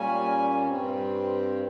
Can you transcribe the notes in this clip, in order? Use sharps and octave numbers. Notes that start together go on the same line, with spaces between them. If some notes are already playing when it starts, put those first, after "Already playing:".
Already playing: A#2 G3 A#3 C#4 G#5
G2 G3 C4